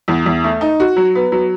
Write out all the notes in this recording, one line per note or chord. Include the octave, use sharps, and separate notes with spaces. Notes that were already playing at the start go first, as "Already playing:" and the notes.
E2
E2
A3
D#4
F#4
F#3
B3
F#3